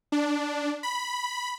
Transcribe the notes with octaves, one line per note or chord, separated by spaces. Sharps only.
D4
B5